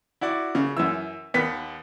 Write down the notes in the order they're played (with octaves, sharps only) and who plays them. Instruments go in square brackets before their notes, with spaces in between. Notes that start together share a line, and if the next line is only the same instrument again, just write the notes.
[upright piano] E4 F#4 D5
[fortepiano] C#3
[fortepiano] F#2 E3 [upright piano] E6
[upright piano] D#2 B6 [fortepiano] B3